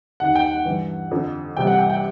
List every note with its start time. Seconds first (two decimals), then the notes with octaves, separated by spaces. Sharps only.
0.20 D#2 D#3 F#5
0.35 G5
0.51 F#5
0.65 G2 E3
1.11 F2 D3 F3
1.56 C2 C3 E3 G5
1.67 F#5
1.79 G5
1.90 G5